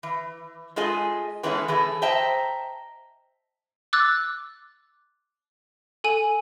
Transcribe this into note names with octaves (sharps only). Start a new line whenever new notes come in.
E3
G#3 A3 F4 G#4 D#5 G#5
E3 G#3 A3 B3 C#4 E4
E3 G#4 A4
C5 D#5 E5 G5 A5 A#5
D6 E6 F#6 A6
A4 G#5 D#7